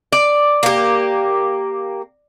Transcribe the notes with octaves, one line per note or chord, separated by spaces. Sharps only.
D5
A#3 G4